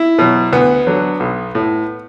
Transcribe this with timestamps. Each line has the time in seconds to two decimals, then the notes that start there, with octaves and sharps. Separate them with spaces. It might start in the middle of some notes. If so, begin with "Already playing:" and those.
Already playing: E4
0.18 B2 F#3
0.53 D2 B3
0.87 D3 F#3
1.20 B1
1.55 A2